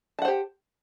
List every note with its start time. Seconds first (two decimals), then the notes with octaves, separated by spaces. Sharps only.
0.19 A5
0.22 F#5
0.25 C5
0.28 G4